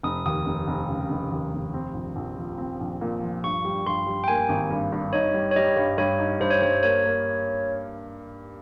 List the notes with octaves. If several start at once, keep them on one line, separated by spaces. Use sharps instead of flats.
F1 D#6
D#2 D#6
F1
F1
C#3
F1
D#2
F1
C4
A#1
A#1
F3
C4
A#1
A#2
F3
G2 C#6
G3
G2 C6
G3
G5
A#3 G#5
G#1
G2
G2
D#4 C#5
G3
C#5
G3 D#5
G2
G2 C#5
D#4
G2 C5
C#5
G2 C5
A#3 C#5
A#3